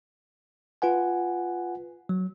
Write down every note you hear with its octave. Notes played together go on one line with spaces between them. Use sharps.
F4 B4 F#5 G#5
F#3